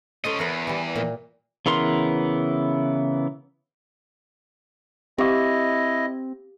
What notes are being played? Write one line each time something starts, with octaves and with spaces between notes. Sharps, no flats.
C#4 A4 C5 C#5 D#5
E2 A#4 B4 F#5
E3 G3
A#2
C#3 E3 B3 A#4 C6
C4 E4 G4 D#5 F5 D6